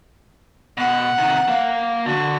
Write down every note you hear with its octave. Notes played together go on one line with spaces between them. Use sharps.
B2 F#5
C3 D#3
A#3 F5
D3 F#4